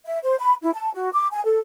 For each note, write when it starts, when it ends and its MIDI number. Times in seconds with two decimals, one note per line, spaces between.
0.06 0.19 76
0.23 0.36 72
0.38 0.54 83
0.62 0.70 64
0.73 0.90 81
0.94 1.09 66
1.13 1.27 86
1.32 1.41 80
1.44 1.59 69